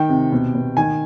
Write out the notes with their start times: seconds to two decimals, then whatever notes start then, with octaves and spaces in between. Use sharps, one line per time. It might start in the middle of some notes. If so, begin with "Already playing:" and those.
Already playing: D#3 G5
0.09 C3
0.32 B2
0.55 B2
0.77 D#3 G#5